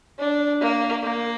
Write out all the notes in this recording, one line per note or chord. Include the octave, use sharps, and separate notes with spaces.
D4
A#3
A#3